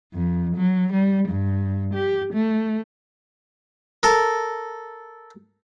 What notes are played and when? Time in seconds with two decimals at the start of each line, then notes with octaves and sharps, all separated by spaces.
0.14 F2
0.56 F#3
0.93 G3
1.29 G2
1.94 G4
2.33 A3
4.03 A4 A#4